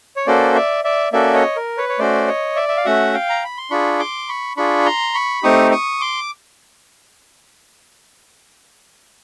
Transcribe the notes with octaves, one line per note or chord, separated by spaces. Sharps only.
C#5
A#3 C#4 F#4 A4 C5 D5
D5 E5
D5 E5
A#3 C#4 F#4 A4 D5 E5
C#5 D#5
A#4
B4 C#5
C#5
A3 C#4 F#4 C5 D5
C#5 D#5
D5 E5
E5
F5
A3 C#4 F#4 E5 F#5
F5 G5
A#5
B5
C6
D4 F4 G#4 B5 C#6
C6 D6
B5 C#6
D4 F4 G#4 B5 C#6
A#5 C6
B5 C#6
A3 C4 D#4 G4 C#6 D#6
C#6 D#6
C6 D6